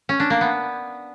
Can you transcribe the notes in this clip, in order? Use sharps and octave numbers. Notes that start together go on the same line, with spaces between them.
C#4
D4
A#3
B3